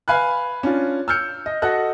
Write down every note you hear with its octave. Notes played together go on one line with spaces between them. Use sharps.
B4 F5 G#5 B5 F#6
C#4 D4 F4
E6 F6 G6 C#7
D#5
F#4 A4 D#5 F#6